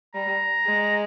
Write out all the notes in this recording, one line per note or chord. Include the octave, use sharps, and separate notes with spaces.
G3 A#5
G#3